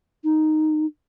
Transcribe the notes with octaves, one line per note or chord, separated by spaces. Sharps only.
D#4